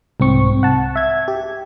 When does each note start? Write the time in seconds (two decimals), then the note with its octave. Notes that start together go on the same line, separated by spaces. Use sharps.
0.20 C2 G#2 C4 C#6
0.63 F#5 A5
0.96 E5 G#6
1.28 G4